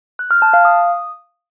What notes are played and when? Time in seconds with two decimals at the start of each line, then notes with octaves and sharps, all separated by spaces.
0.19 F#6
0.31 F6
0.42 A5
0.53 F5
0.65 D#6